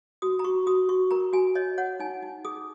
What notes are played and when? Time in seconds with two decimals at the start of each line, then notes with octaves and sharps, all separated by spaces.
0.22 F#4 D#6
0.39 A#5
0.44 F#4 C#6
0.67 F#4 D#6
0.89 F#4 C#6
1.11 A#4 A#5
1.33 F#4 G#5
1.55 C#5 D#5
1.78 C#5 F#5
2.00 D#4 G#5
2.22 D#4
2.45 G#4 D#6